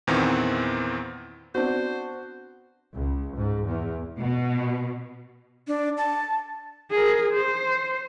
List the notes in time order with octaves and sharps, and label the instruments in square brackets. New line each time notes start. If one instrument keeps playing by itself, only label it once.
[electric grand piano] E2 A#2 D#3 E3 B3 C4
[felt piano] B3 C4 D4 [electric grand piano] F#4 [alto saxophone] C5
[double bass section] C#2
G#2
E2
[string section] B2
[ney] D4
A5
[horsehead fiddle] G#4 A#4
C5